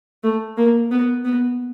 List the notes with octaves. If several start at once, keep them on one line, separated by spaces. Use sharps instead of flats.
A3
A#3
B3
B3